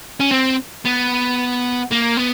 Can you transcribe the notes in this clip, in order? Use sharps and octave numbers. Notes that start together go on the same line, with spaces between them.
C#4
C4
B3
A#3
B3